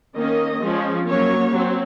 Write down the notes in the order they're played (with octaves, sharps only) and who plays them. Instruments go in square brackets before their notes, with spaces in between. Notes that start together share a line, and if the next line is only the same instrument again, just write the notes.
[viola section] D#3 A#3 C#4 D#5
F3 G#3 C#4
F#3 A#3 C#4 C#5
F#3 C4